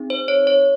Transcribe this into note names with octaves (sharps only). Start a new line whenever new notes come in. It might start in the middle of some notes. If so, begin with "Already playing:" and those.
Already playing: C4 D#4 G#4
C5
C#5
C#5